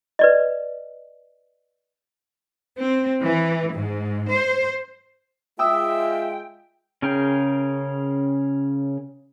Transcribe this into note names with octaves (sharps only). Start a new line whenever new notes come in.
B4 D5 D#5
C4
E3
G#2
C5
G#3 F4 E5 G5 D#6 E6
C#3 C#4 G#4 A#4 G5